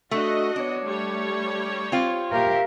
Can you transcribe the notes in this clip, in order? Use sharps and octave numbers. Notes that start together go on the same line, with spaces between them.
A3 D4 F#4 A4 D#5
B3 D4 C#5
G3 A3 C#5
C4 F4
A#2 G4 A#4 E5 F5